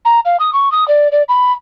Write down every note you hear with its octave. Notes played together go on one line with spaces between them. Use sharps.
A#5
F5
D#6
C#6
D#6
D5
D5
B5